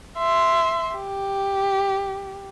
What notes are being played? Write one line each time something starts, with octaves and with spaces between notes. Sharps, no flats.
E5 C6
G4